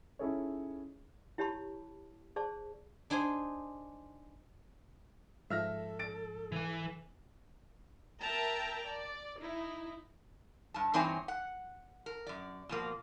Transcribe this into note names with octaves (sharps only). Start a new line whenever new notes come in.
C#4 D#4 E4 G#4 A4 C#5
E4 G4 C#5 A5 B5 C#6
G#4 C5 D5 A5 C#6
D4 D#4 G#4 C5 G#5
G#2 F3 A4 E5 F6 A#6
A6 D7
E3 G#5
A#4 E5 G5 A5 A#5
D5
D#4 E4
G2 A5
G2 E3 C4 D#4 C#5 G#5
F#5
A#4
F#2 D5
B2 F3 A#3